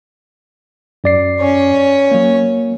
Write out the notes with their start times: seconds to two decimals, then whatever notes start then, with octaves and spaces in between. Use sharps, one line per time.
1.04 F#2 D5 C7
1.41 C#4 C#5
2.11 F#3 A#3